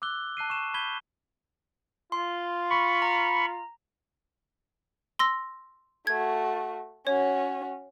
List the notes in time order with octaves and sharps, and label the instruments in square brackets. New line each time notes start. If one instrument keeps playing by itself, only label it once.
[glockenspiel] D6 E6 F#6 G7
A5 F#6 C7 D#7
C#6 E7
B5 G6 G#6 B6 D#7 G7
[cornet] F4 [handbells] C6
[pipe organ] B5 C#6
[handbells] A#5
[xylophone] C6 E6 A#6
[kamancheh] A3 F#4 [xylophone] G#6
[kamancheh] C#4 F#4 [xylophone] C#5